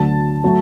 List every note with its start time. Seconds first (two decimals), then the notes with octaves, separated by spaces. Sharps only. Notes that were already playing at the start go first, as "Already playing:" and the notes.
Already playing: D2 D3 F#3 A5
0.44 F#3 A3